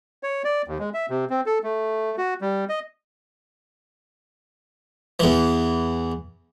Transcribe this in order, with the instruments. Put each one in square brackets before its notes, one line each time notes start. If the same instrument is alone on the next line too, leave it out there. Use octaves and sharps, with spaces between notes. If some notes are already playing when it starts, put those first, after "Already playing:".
[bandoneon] C#5
D5
D#2
G#3
E5
C3
C4
A4
A3
F#4
G3
D#5
[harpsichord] E2 E3